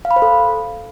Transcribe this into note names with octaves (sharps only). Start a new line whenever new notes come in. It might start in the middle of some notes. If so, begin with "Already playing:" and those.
F5
B5
C5
A4